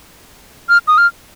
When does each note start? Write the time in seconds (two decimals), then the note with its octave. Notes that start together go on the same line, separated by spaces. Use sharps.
0.69 F6
0.88 D#6
0.98 F6